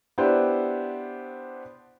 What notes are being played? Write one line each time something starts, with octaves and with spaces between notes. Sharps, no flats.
B3 D4 E4 G4 B4 C5